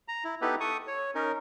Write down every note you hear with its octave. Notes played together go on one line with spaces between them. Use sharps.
A#5
E4
B3 D#4 E4 G4 A4 B4
A4 C#6 D#6
C#5
C#4 D#4 A#4